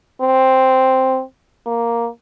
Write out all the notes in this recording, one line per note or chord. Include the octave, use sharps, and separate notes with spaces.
C4
A#3